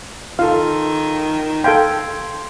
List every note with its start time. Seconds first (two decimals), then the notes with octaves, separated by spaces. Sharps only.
0.39 D#3 F4 A4 F5
1.64 A4 F5 G5 C6 G#6